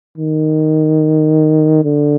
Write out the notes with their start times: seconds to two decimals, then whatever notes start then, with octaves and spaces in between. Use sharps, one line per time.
0.18 D#3
1.85 D3